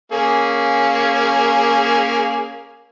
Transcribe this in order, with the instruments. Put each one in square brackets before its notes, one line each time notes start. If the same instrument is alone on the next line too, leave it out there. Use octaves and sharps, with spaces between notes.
[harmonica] A#3 C#4 G#4